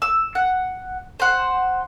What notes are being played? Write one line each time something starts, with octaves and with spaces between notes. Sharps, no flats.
E6
F#5
C5 F#5